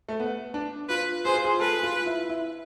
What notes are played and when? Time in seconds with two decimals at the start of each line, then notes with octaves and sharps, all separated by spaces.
0.09 A3
0.20 B3
0.54 D4
0.89 F4 B4
1.25 G#4 C5
1.34 F4
1.44 G#4
1.60 A4 B4
1.83 F4
2.06 E4
2.29 E4